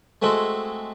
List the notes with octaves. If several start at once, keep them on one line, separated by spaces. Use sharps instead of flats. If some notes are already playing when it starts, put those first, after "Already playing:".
G#3 A3 C4 F#4 A4